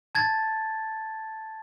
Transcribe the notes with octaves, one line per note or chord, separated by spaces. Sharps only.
A5 G#6 A6